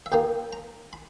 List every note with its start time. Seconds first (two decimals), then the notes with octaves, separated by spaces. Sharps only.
0.06 E5
0.12 D#2 D#3 A#3 G5
0.53 A#5
0.93 B5